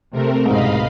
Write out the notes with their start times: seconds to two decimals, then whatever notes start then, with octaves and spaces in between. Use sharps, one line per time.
0.12 C3 A3 C4 A#4
0.46 G1 C2 G#2 B2 D#5 F5 B5